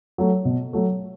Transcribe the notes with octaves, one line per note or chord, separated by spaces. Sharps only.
F#3 A3
B2
F#3 A3